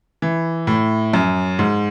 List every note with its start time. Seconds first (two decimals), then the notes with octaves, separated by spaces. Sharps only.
0.22 E3
0.67 A2
1.13 F#2
1.59 G#2